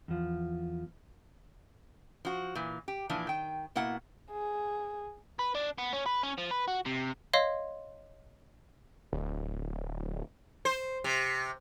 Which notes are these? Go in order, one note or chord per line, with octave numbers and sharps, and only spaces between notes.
E2 F3
F3 F#4
A#2 E3
G4
A#2 E3 F3 D4
D#3 G5
B2 A#3 E4 F#5
G#4
B4
D4
B3
C#4
B4
C#4
F3
B4
F#4
C3
C#5 D#5 F5 C6
D1
C5
C3